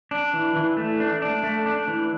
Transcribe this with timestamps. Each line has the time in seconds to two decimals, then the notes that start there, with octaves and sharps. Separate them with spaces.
0.11 D4
0.34 E3
0.56 E3
0.77 A3
1.00 D4
1.22 D4
1.43 A3
1.66 D4
1.88 E3